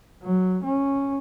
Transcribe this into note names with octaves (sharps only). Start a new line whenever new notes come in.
F#3
C#4